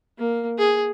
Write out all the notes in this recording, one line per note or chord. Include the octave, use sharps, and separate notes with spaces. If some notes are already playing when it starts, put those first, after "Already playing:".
A#3
G#4